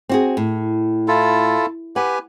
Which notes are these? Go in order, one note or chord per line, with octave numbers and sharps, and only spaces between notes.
C4 F#4 G#4
A2
E4 F4 A4
G4 B4 F#5 G#5